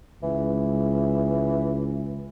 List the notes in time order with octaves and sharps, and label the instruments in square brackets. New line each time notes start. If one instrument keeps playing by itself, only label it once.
[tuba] C#2 [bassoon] E3